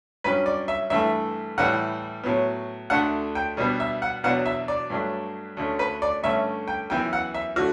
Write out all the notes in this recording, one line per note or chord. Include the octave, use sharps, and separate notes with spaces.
G2 F#3 C#4 B4
D5
E5
G2 E3 A3 E5
A2 E3 G3 F#5
A2 F#3 B3
D2 D3 A3 D4 F#5
G5
B2 G3 B3 D4
E5
F#5
E2 B2 F#3 B3 D4 F#5
E5
D5
G2 F#3 A3 D4
D2 D3 A3 C#4
B4
D5
G2 D3 A3 C#4 E5
G5
F#2 E3 B3 G5
F#5
E5
D3 A3 F#4